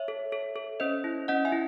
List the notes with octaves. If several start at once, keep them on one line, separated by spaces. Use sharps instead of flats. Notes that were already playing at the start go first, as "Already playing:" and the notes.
Already playing: C#5 E5
A4
A4
A4
C#4 C5 D#5
E4
C#4 D#5 F#5
E5 G#5
E4